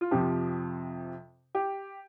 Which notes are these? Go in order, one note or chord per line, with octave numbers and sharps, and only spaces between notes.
F4
F2 C3 F3 G4
G4